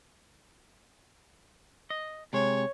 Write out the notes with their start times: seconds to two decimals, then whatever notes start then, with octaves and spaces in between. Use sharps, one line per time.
1.90 D#5
2.33 C3 G#3 C#5